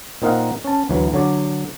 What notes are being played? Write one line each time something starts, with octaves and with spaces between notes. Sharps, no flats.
A#2 C4 D#4 A#4 F5 F#5
C#4 A5
D2 E3 F#3
D3 F#3 C#5 D5